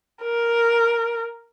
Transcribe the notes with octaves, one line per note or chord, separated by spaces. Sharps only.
A#4